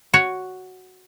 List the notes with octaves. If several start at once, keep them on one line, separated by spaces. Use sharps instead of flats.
F#4 C#5